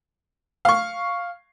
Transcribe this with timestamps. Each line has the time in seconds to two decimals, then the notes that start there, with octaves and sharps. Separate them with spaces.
0.65 F5 C#6